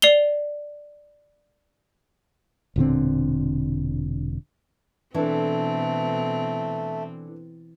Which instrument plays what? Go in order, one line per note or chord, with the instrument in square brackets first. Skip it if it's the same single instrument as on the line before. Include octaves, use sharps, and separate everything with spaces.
[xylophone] D5 C7 F7 G7
[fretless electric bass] E1 A#2 D3 C4
[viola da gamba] B2 C4 [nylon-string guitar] E3 [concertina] A3 [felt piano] D4 A4